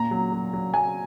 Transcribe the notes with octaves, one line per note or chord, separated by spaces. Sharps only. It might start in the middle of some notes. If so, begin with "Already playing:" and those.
Already playing: A#2 A#5
F#3
F#3
F#3
F#3 G#5